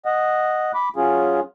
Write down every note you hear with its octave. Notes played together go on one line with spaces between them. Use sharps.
D#5 F#5
B5 D6
F#3 C#4 F4 G#4